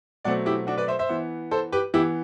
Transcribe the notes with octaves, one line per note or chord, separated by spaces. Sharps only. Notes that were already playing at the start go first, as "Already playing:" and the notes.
B2 F#3 A3 C4 D5 F#5
E4 G4
D4 F#4
B4 D5
C5 E5
C5 E5
E3 B3
A4 C5
G4 B4
E3 B3 E4 G4